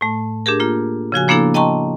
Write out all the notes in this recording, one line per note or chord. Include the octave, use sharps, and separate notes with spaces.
A2 A3
D4 G4 G#4 A#4
A#3 F4
C#3 F3 F#4 G#5
F3 A#3 B3 D4 E4 A4
D#5 G5 A5 A#5 C6 C#6